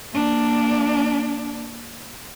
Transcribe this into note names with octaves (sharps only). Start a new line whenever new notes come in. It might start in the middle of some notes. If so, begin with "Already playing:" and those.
A#3 D4